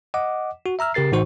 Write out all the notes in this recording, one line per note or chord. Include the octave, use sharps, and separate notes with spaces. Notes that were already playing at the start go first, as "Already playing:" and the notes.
D#5 F#5 D6
F#4
E5 A#5 E6 F6
C#3 G4 A#4 A6 C7
A2 E3 D#4 F#4 C5 C#6